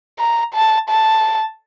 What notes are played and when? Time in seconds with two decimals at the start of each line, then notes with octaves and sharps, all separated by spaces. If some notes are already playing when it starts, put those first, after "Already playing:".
0.20 A#5
0.54 A5
0.89 A5